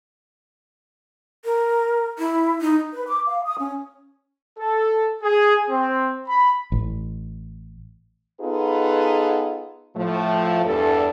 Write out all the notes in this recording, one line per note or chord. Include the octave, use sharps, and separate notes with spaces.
A#4
E4
D#4
B4
D6
F5
D#6
C#4
A4
G#4
C4
B5
A1
B3 D#4 F4 G#4 A4 B4
A2 F3 A3
E2 G2 A4